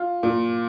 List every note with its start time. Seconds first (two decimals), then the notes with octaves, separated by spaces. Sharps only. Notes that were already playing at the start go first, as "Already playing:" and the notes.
Already playing: F4
0.23 A#2